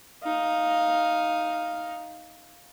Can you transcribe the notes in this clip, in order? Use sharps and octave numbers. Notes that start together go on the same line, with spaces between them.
D#4 F5